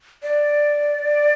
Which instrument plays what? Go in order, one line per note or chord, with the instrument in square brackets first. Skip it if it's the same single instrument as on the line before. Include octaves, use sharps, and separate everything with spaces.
[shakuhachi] D5